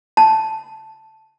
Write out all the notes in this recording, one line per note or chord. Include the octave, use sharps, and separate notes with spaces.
A5